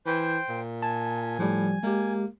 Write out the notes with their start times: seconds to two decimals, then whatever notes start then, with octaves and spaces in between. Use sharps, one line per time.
0.07 E3 C5 G5
0.49 A#2
0.83 G#5 A5
1.39 A2 F3 G3
1.83 G#3 A#3 G4